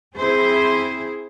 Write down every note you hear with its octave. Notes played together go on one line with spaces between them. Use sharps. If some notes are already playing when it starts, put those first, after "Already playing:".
C4 E4 G#4 C5